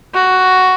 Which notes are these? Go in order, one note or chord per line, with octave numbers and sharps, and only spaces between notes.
F#4